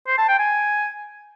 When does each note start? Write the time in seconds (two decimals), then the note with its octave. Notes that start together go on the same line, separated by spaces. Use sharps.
0.07 C5
0.18 A5
0.28 G5
0.39 G#5